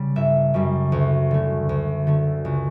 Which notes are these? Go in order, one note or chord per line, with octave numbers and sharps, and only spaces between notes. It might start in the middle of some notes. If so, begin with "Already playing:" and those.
Already playing: C#3 G3
G1 E5
F#2 C#3 G3
D2
D3 A3
D2
D3 A3
C#2